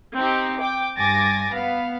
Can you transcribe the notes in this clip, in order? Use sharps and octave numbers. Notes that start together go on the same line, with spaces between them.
C4 D#4 G4
G5 D6
G2 G#5 D6 A6 A#6
B3 F5